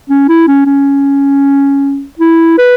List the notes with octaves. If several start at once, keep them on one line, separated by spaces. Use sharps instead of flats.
C#4
E4
C#4
C#4
E4
B4